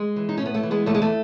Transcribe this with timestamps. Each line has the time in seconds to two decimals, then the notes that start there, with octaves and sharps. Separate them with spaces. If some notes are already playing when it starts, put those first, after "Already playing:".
Already playing: G#3
0.16 E3
0.29 D#4
0.38 A2 C#4
0.46 B3
0.54 A3
0.63 E3
0.71 G#3 B3
0.86 E2 A3
0.95 G#3
1.02 A3